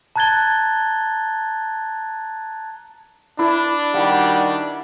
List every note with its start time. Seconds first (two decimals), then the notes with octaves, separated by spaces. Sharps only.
0.16 A5 A#5 F#6 G#6 A6 G7
3.39 D4 E4 B4
3.94 D#3 G3 F#4 F#5